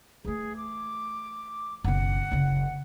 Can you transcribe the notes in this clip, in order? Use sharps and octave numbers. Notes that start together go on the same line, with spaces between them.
E3 A3 G#4
D6
F#1 B1 F#5
F#1 C#3